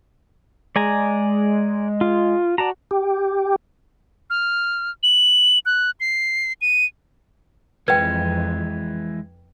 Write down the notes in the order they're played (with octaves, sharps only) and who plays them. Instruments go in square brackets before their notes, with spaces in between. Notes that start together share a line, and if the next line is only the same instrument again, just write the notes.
[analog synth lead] G#3 [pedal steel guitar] D5 G#5 A#5
[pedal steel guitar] F4
[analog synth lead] F#4 [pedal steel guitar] D5 A5 A#5
[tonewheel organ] G4
[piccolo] F6
F#7
F#6
C7
D#7
[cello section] F2 [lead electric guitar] E3 G#3 [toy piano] B4 G5 [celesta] G#6